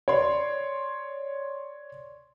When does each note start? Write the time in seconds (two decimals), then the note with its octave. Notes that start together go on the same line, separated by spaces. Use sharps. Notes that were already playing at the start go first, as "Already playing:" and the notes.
0.08 C#5 D5 C6